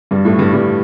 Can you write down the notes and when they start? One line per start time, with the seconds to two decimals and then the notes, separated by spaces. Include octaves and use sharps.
0.11 G2 G3
0.25 A2 A3
0.39 G2 G3
0.54 G2 G3